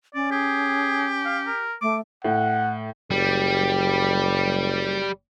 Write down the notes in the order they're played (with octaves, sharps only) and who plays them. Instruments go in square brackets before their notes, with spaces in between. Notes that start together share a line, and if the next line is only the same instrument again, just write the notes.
[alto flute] C#4 [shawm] D5
[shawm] G4 [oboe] G#4
[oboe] F5
A#4
[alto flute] A3 [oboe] D6
[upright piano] A2 [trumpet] F#5
[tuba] F#1 [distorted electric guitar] G3